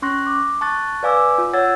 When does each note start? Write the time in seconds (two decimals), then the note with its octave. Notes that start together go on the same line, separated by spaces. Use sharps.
0.02 C#4 C6 C#6 F#6 A#6
0.27 D6
0.61 A5 C#6 F#6 A6
1.03 B4 D5 F5 G#5 D6 E6
1.38 F4
1.53 C#5 F#5 E6 G#6 A6